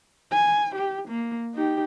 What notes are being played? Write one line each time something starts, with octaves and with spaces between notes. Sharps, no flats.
G#5
G4
A#3
D#4 G4